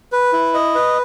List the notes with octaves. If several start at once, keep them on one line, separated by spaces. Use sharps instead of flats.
B4
E4
D#5
B4